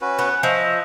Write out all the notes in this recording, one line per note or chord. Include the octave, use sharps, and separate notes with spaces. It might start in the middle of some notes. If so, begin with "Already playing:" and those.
C#4 F#4 B4
B3 F#5
F3 D#5 E5